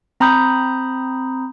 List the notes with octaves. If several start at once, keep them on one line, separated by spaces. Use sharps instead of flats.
C4 A#5 B5 D#6 G6